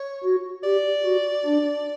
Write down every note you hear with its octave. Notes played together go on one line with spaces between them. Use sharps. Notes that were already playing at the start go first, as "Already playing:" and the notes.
Already playing: C#5
F#4
G4 D5
F#4
D4